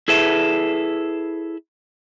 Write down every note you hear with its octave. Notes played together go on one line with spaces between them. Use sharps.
E4 G#4 A4 B4 E5